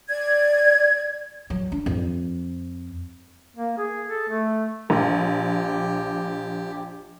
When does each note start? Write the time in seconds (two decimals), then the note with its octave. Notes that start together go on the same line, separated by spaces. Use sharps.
0.09 D5 G#6
1.50 F#3
1.72 D4
1.86 F2
3.56 A#3
3.77 G#4
4.08 A4
4.29 A3
4.90 A#1 G4